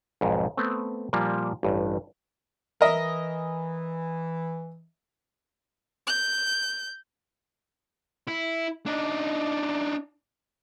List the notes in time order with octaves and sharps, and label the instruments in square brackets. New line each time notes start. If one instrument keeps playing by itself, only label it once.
[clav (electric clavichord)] B1 F2 G#2
A3 B3 C4
A#2 F3 G3 A#3
A1 G2
[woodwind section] E3 [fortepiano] A#4 D#5 E5
[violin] G6
[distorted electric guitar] E4
D4 D#4